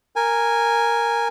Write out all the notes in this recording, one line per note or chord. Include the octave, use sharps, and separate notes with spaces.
A#4 G#5